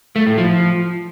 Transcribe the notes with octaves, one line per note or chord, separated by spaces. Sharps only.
A3
A2
F3